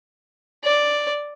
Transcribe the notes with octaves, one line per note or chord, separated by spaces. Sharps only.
D5